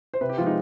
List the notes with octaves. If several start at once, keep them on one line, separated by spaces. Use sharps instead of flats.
C5
C3 B4
G4
F3 G#3 F4
D#4